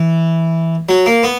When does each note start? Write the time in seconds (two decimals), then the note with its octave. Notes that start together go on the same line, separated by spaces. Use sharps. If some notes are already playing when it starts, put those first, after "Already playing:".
Already playing: E3
0.89 F#3
1.06 A#3
1.23 B3